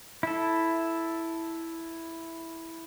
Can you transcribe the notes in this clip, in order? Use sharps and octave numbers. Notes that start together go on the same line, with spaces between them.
E4 A4